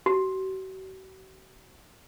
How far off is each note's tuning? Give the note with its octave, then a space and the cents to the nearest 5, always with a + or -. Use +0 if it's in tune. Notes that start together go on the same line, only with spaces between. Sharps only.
F#4 +45